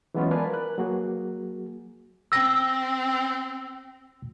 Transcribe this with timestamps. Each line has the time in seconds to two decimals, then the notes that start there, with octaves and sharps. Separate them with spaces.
0.14 E3 F#3 G#3 B3 C#4 F4
0.31 A#4 B4 D5 F5 G#5 A5
0.50 A#4 B4 F#6
0.78 F#3 A#3 F#4 G#4
2.32 C4 E6 A#6